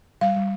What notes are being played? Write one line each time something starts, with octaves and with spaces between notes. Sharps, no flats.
G3 F5
G3